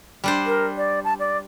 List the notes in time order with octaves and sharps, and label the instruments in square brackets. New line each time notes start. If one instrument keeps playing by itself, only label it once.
[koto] G3 D4 C5
[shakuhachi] A#4
D5
A5
D5